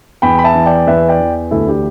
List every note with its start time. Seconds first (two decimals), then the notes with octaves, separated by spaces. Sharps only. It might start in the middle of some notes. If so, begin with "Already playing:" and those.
0.22 E2 G5 B5
0.39 B5
0.44 E5 A5
0.55 E3
0.66 D5 G5
0.87 E2 B4 E5
1.09 D5 G5
1.20 E3
1.51 D2 E4 A4
1.67 D4 G4